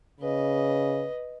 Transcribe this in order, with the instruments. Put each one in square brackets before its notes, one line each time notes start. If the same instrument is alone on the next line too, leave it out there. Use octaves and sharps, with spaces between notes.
[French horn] C#3 [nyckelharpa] B4 D#5